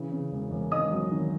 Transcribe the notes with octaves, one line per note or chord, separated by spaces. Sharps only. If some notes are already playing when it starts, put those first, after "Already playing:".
Already playing: C#3 E3
C#3
E1
E1
G#1 D#5 D#6
F#3
D#3